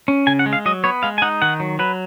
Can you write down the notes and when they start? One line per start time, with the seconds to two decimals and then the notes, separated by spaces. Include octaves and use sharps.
0.08 C#4
0.27 C#3 G#5
0.39 F#5
0.46 G#3
0.53 F5
0.66 F#3 D#5
0.84 B3 C#5
1.03 G#3 F5
1.18 G#5
1.22 D#4 F#5
1.42 D#3 F#5
1.60 F#3
1.79 F#3 B4